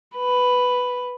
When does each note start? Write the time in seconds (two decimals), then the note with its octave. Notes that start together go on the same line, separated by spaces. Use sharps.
0.17 B4